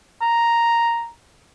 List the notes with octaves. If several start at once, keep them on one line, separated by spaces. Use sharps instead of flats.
A#5